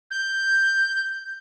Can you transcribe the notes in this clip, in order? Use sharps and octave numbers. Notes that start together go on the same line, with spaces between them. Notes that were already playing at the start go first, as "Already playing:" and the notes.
G6